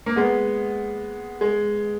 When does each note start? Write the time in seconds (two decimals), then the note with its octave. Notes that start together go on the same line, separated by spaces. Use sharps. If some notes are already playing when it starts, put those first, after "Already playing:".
0.06 A#3
0.16 G#3 B3
1.41 G#3